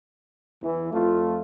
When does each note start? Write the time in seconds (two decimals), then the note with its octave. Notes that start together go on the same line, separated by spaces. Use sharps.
0.63 E2 E3
0.92 F2 A3 F4